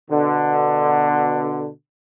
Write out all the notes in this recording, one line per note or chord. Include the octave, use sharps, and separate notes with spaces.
B2 D3